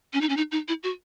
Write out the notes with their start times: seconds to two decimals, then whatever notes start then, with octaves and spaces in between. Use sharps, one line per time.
0.13 C#4
0.21 D#4
0.29 C#4
0.37 D#4
0.52 D#4
0.68 E4
0.83 F#4